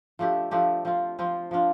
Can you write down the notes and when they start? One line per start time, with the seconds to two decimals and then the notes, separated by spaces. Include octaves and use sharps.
0.19 F3 A3 D4 G4
0.51 F3 A3 D4 G4
0.85 F3 C4 F4
1.19 F3 C4 F4
1.51 F3 D4 F4